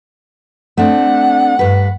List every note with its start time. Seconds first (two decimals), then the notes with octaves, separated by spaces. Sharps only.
0.77 A3 C4 D4 F#5
1.59 G2 B4